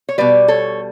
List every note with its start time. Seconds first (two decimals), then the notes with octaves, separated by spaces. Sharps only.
0.09 C#5
0.18 B2 G3 B4 D5
0.48 A4 C#5